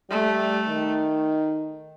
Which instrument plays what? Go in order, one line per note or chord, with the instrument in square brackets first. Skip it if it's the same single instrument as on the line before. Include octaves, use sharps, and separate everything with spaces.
[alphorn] G3 [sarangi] A3
[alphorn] D#3